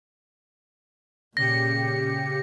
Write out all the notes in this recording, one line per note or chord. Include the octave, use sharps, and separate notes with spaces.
A#2 C#3 G4 A#6 C#7